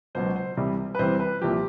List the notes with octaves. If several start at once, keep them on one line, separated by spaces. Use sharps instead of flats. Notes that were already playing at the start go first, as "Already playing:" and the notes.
C#2 B2 F#3 C5
C5
C2 C3 E3 G3
B4
C2 C3 E3 G3 C5
B4
C2 A#2 F3 G4